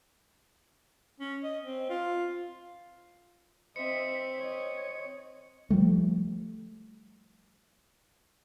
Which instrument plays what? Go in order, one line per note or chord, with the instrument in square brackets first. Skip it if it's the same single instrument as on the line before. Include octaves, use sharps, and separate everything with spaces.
[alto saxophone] C#4
D#5
C4
F4
[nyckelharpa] C4 [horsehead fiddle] D#5 E5 [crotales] C#7
[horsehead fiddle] C#5 D#5
[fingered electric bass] F3 G3 A3